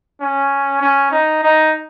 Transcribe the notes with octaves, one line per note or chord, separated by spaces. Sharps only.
C#4
C#4
D#4
D#4